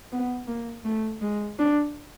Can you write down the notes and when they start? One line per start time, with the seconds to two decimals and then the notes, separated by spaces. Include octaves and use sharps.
0.12 B3
0.48 A#3
0.85 A3
1.22 G#3
1.59 D4